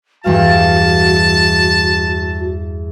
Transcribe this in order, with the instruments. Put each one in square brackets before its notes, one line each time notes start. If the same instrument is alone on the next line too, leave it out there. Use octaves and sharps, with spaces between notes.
[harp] E2 G2 F5 [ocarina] F#4 [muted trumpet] A5